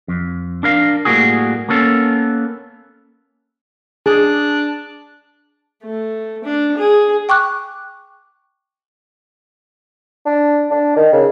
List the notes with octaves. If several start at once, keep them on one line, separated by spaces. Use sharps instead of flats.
F2
D4 A#4 F5
A2 G3 A#3 F#4 G#4
A#3 B3 C#4 A4
D4 G#4
A3
D4
G#4
G5 C#6 D6 F#6
D4
D4
D#3
C#3